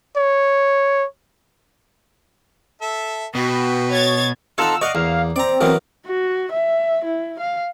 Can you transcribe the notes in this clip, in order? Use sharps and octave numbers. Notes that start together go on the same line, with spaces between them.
C#5
A4 E5
B2 F#4 B4 G5
C#5 G#6 A6
C4 D#4 F4 A4 F#5 E6
D5 D#5 F5 F#5 C#6
E2 A#3 F5
C4 D5 A#5
E3 F#3 B3 A#4
F#4
E5
E4
F5